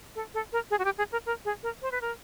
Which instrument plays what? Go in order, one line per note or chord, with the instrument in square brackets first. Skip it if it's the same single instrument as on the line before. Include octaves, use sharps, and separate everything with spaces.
[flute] A4
A4
A#4
G#4
F#4
G4
G#4
A#4
A#4
G#4
A#4
C5
B4
A#4